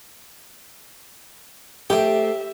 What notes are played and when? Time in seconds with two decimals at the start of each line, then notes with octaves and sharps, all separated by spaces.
1.90 A3 G4 C5 E5 G5